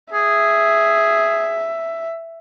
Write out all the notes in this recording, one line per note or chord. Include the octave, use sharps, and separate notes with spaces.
G#4 E5